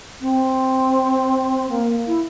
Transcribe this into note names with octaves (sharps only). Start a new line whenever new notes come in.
C4
A#3
E4